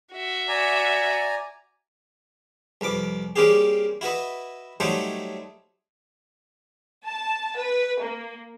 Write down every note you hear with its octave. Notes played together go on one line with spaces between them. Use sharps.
F#4 E5
D5 G#5 A#5
C2 F2 B4 D6
G3 A#3 C4 C#4 G4 G#4
E4 F#4 B4 D#5
F#3 G3 A3 D#4 C5 C#5
A5
B4
A#3